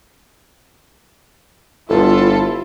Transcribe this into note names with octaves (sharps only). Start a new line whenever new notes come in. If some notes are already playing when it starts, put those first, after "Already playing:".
G1 E4 F4 A4